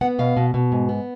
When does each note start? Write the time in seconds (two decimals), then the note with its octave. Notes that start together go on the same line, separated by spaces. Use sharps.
0.01 B3 F#5
0.19 B2 F5
0.37 B2
0.54 B2
0.72 G#2
0.89 B3